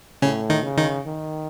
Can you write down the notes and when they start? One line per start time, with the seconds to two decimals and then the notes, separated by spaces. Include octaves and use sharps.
0.22 A2 C#3 C#4
0.50 D#3 D#4
0.63 C#3
0.78 D#3 D#4
1.06 D#3